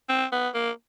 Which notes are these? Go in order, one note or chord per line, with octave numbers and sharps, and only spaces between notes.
C4
B3
A#3